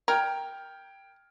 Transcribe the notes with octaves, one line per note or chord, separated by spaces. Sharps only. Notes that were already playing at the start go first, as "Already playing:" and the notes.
A#4 G5 F6 G#6